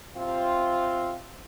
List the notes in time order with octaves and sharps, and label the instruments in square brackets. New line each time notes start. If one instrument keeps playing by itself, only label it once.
[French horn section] C3 C4 F4